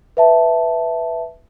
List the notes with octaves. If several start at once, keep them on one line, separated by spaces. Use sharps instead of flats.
B4 E5 A5